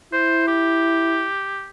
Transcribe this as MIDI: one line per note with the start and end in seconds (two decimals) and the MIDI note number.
0.13 1.27 64
0.13 0.48 72
0.48 1.69 67